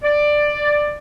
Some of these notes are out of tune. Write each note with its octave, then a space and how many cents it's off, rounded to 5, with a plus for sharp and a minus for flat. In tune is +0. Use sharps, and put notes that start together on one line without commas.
D5 +10